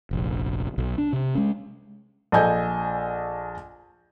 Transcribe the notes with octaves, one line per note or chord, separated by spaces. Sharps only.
F1 A#1
B1
D4
C3
G#3 C#4
A#1 A4 D#5 G#5 G6